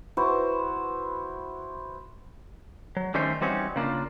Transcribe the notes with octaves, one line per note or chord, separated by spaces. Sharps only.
E4 F#4 B4 C5
F#3
D3 D#3 G3 A3 C#4 C5
E3 G3 C4 C#4 D#4 F#4
C#3 A#3 D4 F4